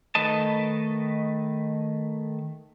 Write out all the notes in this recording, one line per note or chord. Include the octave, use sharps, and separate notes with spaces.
D#3 A3 B4 D#5 A5